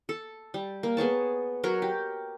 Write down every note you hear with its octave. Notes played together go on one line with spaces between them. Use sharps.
A4
G3
A#3
B3 G#4 C#5 A5
F#3 A#4 C#5
G4